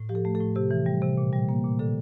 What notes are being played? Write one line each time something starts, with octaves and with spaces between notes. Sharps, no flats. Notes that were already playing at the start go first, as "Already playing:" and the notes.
Already playing: A2
F3 G4
A4
A3
A4
A2
C3 G4
E3
G3
C3
A#2
G3
A#3
A#2
D3 A4